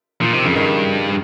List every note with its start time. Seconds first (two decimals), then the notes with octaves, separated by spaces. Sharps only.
0.21 A#2 F3
0.33 C3 D#3
0.45 F2 C#3
0.56 G2 D#3